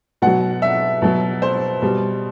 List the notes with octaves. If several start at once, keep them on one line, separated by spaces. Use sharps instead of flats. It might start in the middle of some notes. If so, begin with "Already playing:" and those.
B2 F#3 F#5
E5
B2 F#3
C5
B2 G3